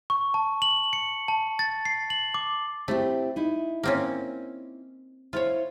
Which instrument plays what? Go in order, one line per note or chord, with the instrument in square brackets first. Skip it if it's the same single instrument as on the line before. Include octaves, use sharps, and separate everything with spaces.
[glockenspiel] C#6
A5
F#7
C#7
A5
A6
C7
F#7
D6
[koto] A3 [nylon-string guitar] C4 E4 G4
[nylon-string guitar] D#4 E4
[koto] A#3 C4 C#4
[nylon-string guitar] E4 C5 [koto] F4 C#5